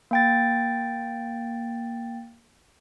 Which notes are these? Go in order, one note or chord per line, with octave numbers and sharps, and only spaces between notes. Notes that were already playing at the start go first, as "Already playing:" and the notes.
A#3 G5 A6